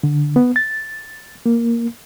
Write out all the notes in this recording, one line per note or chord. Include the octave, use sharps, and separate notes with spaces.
D3
B3
A6
A#3